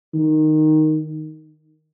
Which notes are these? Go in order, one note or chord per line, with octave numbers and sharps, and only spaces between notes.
D#3